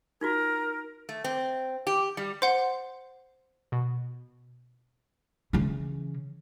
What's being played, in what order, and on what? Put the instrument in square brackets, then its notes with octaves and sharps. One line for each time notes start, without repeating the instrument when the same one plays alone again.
[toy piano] D#4 F4 F#4 [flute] A#4
[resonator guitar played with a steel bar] A3
C4
G4
G3
[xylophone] C5 F#5 [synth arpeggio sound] C6
[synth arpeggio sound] B2
[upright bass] C#3 E3